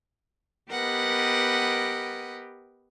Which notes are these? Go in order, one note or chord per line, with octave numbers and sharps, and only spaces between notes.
B3 G4 A#4 B4 D#5 F#5